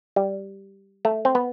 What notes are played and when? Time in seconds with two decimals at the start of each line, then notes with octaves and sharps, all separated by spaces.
0.16 G3
1.05 A3
1.25 C4
1.35 B3